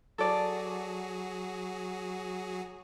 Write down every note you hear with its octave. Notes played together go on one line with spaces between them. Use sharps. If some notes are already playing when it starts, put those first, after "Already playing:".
F#3 F#4 G#4 A4 D5